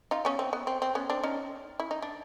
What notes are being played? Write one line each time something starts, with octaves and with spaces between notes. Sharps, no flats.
D#4 F4
B3 C#4
C4
B3
C4
C4
B3 C#4
C4 D4
C#4 D#4
E4
D#4
D4